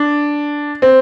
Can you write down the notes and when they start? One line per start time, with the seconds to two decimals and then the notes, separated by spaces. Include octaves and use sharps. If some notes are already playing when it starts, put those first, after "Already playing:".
Already playing: D4
0.82 C4